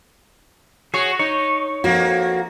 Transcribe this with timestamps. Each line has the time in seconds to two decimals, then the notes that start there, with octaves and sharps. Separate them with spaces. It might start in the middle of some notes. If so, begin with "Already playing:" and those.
0.94 F#4 G#4 C#5
1.19 D#4 C#5
1.84 F2 A#3 F#4